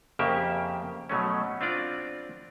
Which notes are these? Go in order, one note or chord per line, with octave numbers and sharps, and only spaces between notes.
F2 C#3 A#3 G4 E5
B2 F#3 A3 C#4
C4 D4 F4 D5